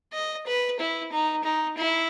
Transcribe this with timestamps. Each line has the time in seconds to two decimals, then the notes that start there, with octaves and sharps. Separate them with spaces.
0.13 D#5
0.46 B4
0.79 E4
1.12 D#4
1.44 D#4
1.77 E4